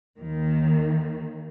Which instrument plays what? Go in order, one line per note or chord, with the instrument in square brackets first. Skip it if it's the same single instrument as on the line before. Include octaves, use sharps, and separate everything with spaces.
[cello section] D#2 D#3